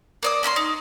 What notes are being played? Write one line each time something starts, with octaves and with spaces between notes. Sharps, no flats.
A#3 D5 D#6
A#3 C#4 B5 C6
D#4